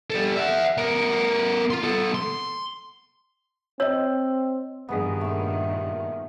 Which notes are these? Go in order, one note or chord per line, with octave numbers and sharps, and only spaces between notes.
G3 A4
E5 F#5
B3 A#4
F4 C6
B3 A4
C6
C4 C#5 D#5 E6
G2 A#2 D#3 B3 G#4 D#5
A3 C#4 E6